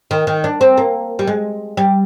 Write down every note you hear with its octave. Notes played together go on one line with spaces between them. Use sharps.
D#3
D#3
D4
C4
A#3
G3
G#3
G3